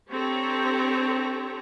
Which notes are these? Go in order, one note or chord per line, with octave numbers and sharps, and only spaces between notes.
C4 D4 G4 A4 C#5 A#5